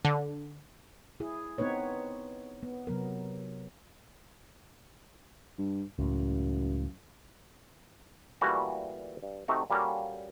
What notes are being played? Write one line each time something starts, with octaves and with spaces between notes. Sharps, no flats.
D3
E4 G#4
B3 C4 D#4 B4 C#5
B3
C3 F#3 B3 A#4
G2
C#2 F#2 A2
A#2 E3 G3 A3 F#4 G4
G2
C3 A3 D#4 F#4
A#2 G3 A#3 C#4 F#4 A4